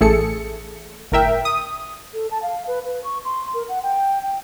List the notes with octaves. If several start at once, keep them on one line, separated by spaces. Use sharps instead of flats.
A1 A3 G#4 A4 C#7
G1 A2 A#4 E5 G5
D#6
A4
A5
F5
B4
B4
C#6
C6
A#4
F#5
G5
G5